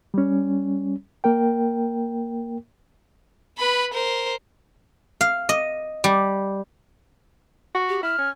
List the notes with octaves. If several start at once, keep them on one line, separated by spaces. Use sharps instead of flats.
G3 C#4
A#3 A#4 G5
B4 B5
A#4 C5
F5
D#5
G3
F#4
G4
E4 F6
C#4